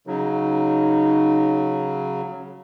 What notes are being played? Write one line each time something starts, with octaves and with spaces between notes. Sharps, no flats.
C#3 F#3 D#4